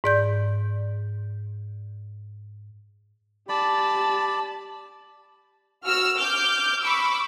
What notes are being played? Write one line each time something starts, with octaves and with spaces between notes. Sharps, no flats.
G#2 D5 G6
G4 D5 A5 B5
F#4 E6 F6
D6 F6 G6
B5 C#6 D6 E6